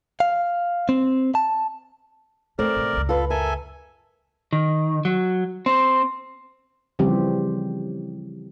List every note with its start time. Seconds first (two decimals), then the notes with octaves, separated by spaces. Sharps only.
0.20 F5
0.89 C4
1.35 A5
2.59 E2 A3 C4 A#4 D5
2.76 G#2 B2
2.93 C#2 F#2
3.09 F4 A4 B4
3.30 A4 A#4 E5 G#5
4.53 D#3
5.05 F#3
5.66 C4
6.99 C#3 E3 F3 G3 C4 G4